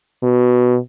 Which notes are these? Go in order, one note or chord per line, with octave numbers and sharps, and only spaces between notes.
B2